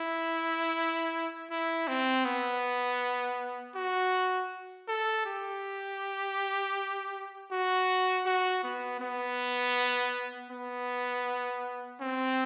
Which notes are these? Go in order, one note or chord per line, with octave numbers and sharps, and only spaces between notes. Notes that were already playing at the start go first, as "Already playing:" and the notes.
Already playing: E4
E4
C4
B3
F#4
A4
G4
F#4
F#4
B3
B3
B3
C4